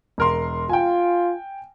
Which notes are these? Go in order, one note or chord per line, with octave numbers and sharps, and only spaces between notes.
E1 A#4 C6
F4 G5 G#5